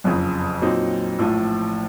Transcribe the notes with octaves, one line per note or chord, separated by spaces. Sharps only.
F#1 F2 C#3
A#2 F#3 C4 D#4
A#1 A2 F3